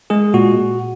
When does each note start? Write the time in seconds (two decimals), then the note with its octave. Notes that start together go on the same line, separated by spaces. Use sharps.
0.10 G#3 G#4
0.34 A#2 F#4